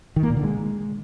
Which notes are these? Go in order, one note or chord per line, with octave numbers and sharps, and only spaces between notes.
D#3
A#3
A#2
D3
G#3